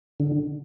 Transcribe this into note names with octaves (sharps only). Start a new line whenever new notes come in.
D3